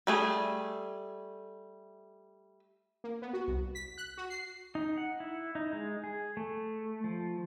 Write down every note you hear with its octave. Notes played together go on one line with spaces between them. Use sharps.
G3 A3 G#4
A#3
B3
F#4
C2
B6
F#6
F#4
C7
D#4
F#5
E4
D#4
G#3
G#4
A3
F3